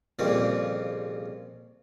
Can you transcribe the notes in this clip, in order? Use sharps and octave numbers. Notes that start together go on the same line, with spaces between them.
C2 F2 A#2 C#3 C4